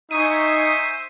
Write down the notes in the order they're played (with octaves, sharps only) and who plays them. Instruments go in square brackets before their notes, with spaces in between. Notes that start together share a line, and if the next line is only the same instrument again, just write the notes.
[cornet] D#4 [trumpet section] C5 E5 [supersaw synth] G#5 C#6 D#6 [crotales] D#7